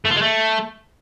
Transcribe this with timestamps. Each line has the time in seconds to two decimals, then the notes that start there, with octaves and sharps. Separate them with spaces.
0.05 A3
0.11 F4
0.16 G#3
0.22 A3